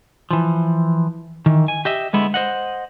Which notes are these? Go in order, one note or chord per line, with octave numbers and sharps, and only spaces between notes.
E3 F3
D#3 E3
G#5
G4 D#5 E5
D3 G#3 B3 E4
C5 D#5 F#5